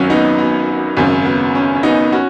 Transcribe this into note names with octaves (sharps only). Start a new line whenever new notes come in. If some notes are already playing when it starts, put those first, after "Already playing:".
Already playing: G#1 F#2 F#3 C#4 F#4
B3 D#4
B3
G#1 F#2 C#3 C#4
B3
C#4
C#4
B3 D#4
C#4 F#4